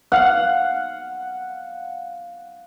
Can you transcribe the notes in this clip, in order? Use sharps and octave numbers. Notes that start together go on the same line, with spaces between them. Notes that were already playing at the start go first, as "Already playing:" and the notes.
F5 F#5